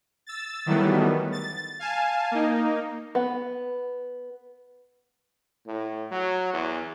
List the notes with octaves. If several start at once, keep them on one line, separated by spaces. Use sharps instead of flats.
E6 A6
D#3 E3 F#3 G3 A3 B3
A6
F5 G#5 A5
A#3 D#4
B3
A2
F#3
E2